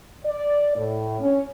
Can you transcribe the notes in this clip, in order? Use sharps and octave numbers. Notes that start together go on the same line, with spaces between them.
D5
A2
C#4